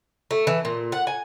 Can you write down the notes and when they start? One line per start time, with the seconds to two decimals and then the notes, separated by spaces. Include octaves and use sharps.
0.31 A3
0.47 E3
0.65 A#2
0.92 F#5
1.07 G#5